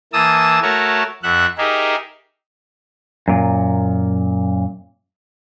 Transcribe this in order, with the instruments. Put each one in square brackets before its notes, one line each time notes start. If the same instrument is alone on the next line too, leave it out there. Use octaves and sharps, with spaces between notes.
[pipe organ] E3 A#3 A5 D#6 E6
A3 F#4 A#4 C#5 A5
F2 E5 F#5 F#6
D#4 G4 G#4 A#4 E5
[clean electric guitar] F#2 A#2